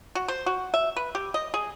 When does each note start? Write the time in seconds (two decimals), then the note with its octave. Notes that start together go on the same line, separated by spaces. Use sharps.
0.15 F#4
0.28 C5
0.46 F#4
0.74 E5
0.96 B4
1.15 G4
1.34 D#5
1.54 G#4